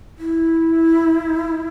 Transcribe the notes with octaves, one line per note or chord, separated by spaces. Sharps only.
E4